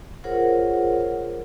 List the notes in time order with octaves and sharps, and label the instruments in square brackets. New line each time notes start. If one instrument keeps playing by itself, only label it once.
[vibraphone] F4 G#4 A#4 C5 C#5 F#5